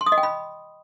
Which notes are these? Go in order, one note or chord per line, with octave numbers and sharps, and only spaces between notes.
C6
D#6
D#5
G5
B5